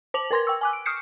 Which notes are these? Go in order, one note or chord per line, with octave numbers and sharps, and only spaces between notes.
C5 D6 F7 F#7
A#4 B4 C6 G#6 A#6
G5 C#6 E6
G#5 D6 F#6
D7
C#6 D#6 F6 G6 C7 C#7